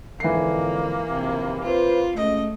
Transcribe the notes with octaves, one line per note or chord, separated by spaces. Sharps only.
F2 G#2 D3 E3 A#3 C7
A#1 D#2 C3
F4 B4 C5
C#2 A3 D#5